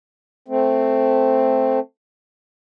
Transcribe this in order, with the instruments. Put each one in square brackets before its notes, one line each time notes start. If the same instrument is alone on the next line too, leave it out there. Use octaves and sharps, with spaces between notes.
[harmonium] A3 C4